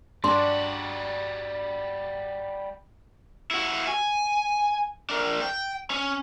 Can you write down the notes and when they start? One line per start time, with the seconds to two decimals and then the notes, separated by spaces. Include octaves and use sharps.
0.24 G2 G3 D4 F#4 C6
3.51 E4 F#4
3.87 G#5
5.10 D4 A#4
5.40 G5
5.90 C#4